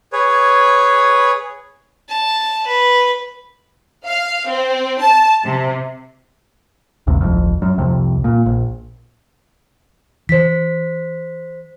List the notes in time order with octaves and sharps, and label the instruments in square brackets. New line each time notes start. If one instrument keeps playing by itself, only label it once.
[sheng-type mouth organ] G#4 B4 C#5
[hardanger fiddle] A5
B4
[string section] F5
C4
A5
C3
[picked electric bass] G#1 D2 G2 C3
D1 G#1 F2
F#2
C2 F2 C3
A#2
A#1
[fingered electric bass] E3 [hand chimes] C5 B6